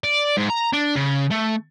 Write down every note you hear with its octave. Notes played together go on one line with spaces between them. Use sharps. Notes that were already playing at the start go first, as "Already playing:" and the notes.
D5
G#2
A#5
D4
C#3
A3